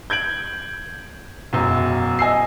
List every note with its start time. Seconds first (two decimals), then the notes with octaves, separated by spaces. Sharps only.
0.10 G6 G#6 D7 F#7
1.53 E1 F#2
2.19 D#5 G#5 E6 C7